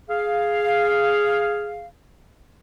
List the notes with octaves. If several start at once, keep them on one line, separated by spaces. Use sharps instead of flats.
G#4 F5